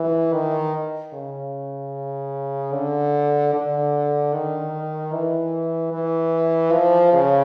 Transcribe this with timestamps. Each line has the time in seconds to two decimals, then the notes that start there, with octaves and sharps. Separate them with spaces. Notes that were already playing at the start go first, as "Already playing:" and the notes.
Already playing: E3
0.33 D#3
1.13 C#3
2.73 D3
3.54 D3
4.33 D#3
5.13 E3
5.92 E3
6.72 F3
7.13 C#3